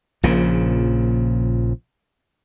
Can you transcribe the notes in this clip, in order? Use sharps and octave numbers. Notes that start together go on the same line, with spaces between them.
A#1 A#2 C#3 F3